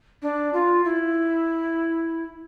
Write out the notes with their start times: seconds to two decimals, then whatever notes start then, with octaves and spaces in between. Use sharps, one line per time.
0.22 D4
0.53 F4
0.85 E4